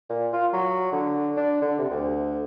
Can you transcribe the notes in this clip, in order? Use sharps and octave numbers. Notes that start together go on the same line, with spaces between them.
A#2
F4
F#3
D3
D4
D3
C3
D2